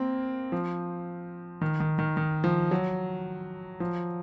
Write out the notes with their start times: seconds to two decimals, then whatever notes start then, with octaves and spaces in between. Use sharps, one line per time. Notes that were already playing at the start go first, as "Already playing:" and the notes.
Already playing: A#3 C4
0.52 F3
1.61 D#3
1.80 D#3
1.99 D#3
2.17 D#3
2.44 F3
2.71 F#3
3.80 F3